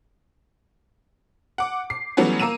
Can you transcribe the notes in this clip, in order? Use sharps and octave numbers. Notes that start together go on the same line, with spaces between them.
F#5 D6
C7
E3 F#3 G3 A3 B3 C#4
A#3 A#5 E6 D#7 E7